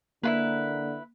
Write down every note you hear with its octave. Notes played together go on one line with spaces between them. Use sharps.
D3 A#3 E4 F4 B4